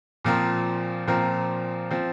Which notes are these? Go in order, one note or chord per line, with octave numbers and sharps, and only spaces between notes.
A#2 F3 C4 A#4
A#2 F3 C4 A#4
F3 C4